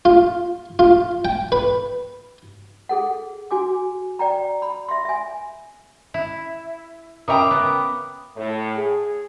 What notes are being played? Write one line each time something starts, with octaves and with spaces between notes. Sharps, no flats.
F4
F4
G5
B4
G#4 A4 F#5
F#4 G#5 D6
D5 G5 A#5
B5
E5 C6
E5 G#5
E4
C#3 A#4 E5 G5 A#5 B5 D6 D#6
B3
A2
G#4